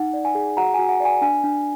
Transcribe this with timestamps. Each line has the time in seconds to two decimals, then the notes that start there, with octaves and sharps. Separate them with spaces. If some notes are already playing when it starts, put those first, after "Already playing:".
Already playing: D#4 F#5
0.13 D5
0.25 G#5
0.35 G#4
0.57 F#4 F#5 A#5
0.74 F#4 G#5
0.89 F#5
1.00 D5 G#5
1.22 D4 G#5
1.44 D4